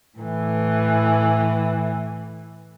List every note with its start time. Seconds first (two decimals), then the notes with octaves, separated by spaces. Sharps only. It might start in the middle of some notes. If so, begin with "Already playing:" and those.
0.18 A2 E3